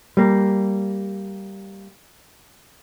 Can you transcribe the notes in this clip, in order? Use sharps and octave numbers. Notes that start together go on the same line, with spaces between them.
G3 A#3